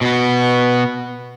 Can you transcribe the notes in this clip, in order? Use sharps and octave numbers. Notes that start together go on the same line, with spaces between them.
B2 B3